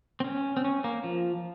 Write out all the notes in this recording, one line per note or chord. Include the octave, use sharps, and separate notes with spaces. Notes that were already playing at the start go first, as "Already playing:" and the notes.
C4
C#4
C4
C#4
A#3
F3